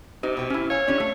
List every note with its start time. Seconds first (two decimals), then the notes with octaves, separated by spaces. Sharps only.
0.23 C3 D#4
0.37 B2 G5
0.50 C#4 E4
0.70 C#5 F5 G#5
0.88 G3 C#4 D4
1.00 A3